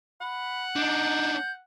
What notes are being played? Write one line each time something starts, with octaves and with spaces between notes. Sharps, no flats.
F#5 B5
D4 D#4 G6